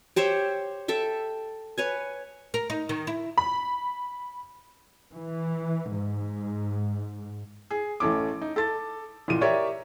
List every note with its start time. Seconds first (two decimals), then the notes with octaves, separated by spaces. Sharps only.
0.16 G4 C5 C#5 E5
0.88 A4 E5 G5
1.78 B4 C#5 G#5
2.54 A#4
2.70 D#4
2.89 D#3
3.07 E4
3.38 B5
5.13 E3
5.97 G#2
7.71 G#4
8.00 A1 A3 C#4 D6
8.41 D#4
8.56 A4 A6
9.28 A1 A#2 D#7
9.41 G4 A#4 C#5 D5 E5